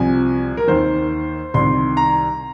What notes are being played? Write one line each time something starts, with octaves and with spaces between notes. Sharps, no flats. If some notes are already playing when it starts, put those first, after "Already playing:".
Already playing: C2 C3 F3 G#5
A#4
D#2 D#3 C5
C2 C3 D#3 C6
A#5